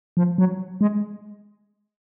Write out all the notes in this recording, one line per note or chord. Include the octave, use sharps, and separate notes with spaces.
F3
F#3
G#3